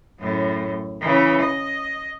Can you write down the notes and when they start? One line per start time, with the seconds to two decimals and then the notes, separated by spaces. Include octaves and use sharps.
0.20 F#2 A2
1.01 C#3 E3
1.41 D#5